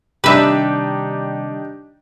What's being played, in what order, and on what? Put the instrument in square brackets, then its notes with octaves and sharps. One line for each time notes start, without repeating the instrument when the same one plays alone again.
[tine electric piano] C3 D#3 G3 [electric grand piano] D4 D#4 G4 [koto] B4 E5